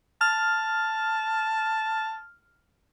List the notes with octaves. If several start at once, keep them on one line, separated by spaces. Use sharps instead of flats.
A5 F6